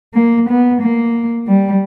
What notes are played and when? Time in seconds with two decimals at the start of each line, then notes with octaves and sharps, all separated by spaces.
0.15 A#3
0.49 B3
0.81 A#3
1.48 G3